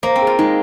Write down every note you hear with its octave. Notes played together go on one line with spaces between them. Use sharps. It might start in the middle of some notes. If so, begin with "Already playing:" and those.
A#3 C5
C4
G#4
F4
G#3 D#4